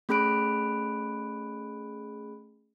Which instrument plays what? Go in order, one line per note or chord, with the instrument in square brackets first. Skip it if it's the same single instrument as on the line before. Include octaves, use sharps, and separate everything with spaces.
[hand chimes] A3 C#4 G#4 B5 F#6 D7